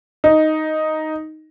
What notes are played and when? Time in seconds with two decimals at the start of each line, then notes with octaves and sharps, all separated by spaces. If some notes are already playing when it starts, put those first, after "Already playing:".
0.24 D#4